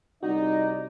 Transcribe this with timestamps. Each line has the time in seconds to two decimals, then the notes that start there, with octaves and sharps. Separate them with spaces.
0.23 C2 D#4 F#4 D5 D#5